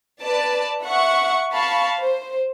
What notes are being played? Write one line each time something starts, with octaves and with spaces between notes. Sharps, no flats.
B4 D5 A5
E5 F#5 C#6
F5 A5 B5 C#6
C5